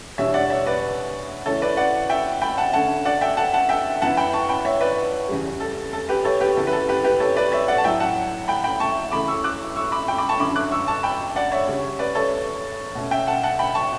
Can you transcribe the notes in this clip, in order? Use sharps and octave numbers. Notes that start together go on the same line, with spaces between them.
E2 B2 G3 D4 C#5 E5
D5 F#5
C#5 E5
B4 D5
C#3 E3 A3 A4 C#5
B4 D5
D5 F#5
E5 G5
G5 B5
F#5 A5
D3 A3 C#4 F#5 A5
D5 F#5
E5 G5
F#5 A5
F#5 A5
E5 G5
F#2 E3 B3 E4 F#5 A5
G5 B5
A5 C#6
G5 B5
C#5 E5
B4 D5
E2 C#3 G3
A4
A4
G4 B4
A4 C#5
G4 B4
F#2 C#3 E3 B3 A4
B4
A4
G4 B4
G4 B4
A4 C#5
B4 D5
C#5 E5
D5 F#5
A5
A2 F#3 A3 E5 G5
F#5 A5
G5 B5
G5 B5
A5 C#6
C#3 E3 A3 B5 D6
C#6 E6
D6 F#6
C#6 E6
B5 D6
G5 B5
B5 D6
A5 C#6
F#2 D3 F#3 C#4 E4 B5 D6
D6 F#6
C#6 E6
A5 C#6
G5 B5
D5 F#5
C#5 E5
C#3 G3 C#4
B4 D5
A4 C#5
B2 A3 C#4
E5 G5
F#5 A5
F#5 A5
G5 B5
A5 C#6